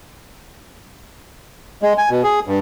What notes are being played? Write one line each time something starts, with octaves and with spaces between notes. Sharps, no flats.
G#3
G#5
B2
G#4
G2